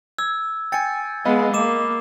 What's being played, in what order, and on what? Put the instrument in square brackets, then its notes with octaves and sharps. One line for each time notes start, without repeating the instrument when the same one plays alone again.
[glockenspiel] E6 [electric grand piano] G#6
[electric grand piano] G5 G#5 [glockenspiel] A6 C#7
[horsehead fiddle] G#3 B3 [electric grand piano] D#5 F5 B5
[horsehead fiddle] A#3 [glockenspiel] D6 E7